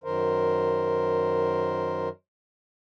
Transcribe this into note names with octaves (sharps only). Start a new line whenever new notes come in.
F#2 D#3 A#4 C5